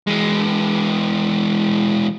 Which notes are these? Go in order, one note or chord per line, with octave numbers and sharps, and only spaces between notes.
E3 G#3